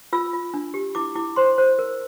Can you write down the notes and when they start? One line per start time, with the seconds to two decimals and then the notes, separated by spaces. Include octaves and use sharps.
0.13 F4 E6
0.33 F4
0.54 D4
0.74 G4
0.95 E4 D6
1.15 E4 D6
1.36 C5 C6
1.58 C5
1.79 A#4